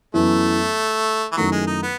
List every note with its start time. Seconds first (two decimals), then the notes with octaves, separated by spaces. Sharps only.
0.14 F#2 E3 A3 B3 E4
1.32 E3
1.37 F#2 D#3 F#3 A3 E4
1.52 G#3
1.67 D#4
1.82 B3